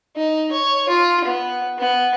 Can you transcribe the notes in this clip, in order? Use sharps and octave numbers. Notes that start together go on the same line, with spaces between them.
D#4
C#5
F4
B3
B3